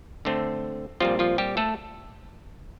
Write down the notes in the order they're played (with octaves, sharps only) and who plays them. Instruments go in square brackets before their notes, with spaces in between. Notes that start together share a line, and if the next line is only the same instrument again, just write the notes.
[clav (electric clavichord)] D3 A3 C4
A#2 F3 G3 C4 F4
F3 F4
G3 G4
A3 A4